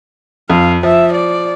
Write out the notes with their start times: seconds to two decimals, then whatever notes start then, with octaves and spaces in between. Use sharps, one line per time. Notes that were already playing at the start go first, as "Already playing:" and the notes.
0.50 F2 F5
0.83 F3 E5
1.13 D5